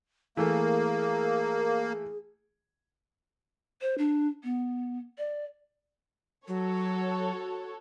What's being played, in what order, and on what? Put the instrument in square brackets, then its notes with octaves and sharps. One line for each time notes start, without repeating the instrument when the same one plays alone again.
[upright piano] E3 A3 [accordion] A#3 [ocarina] G#4
[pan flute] C5
D4
B3
D5
[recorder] F#3 [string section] F#4 A4 C#5